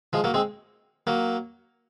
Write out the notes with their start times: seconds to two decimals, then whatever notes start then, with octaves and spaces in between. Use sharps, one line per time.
0.13 F3 G#3
0.24 F#3 A#3
0.34 G#3 C4
1.07 F#3 A#3